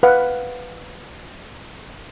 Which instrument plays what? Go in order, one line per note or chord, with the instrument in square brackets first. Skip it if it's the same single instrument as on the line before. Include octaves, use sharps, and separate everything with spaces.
[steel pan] B4 F5 F#5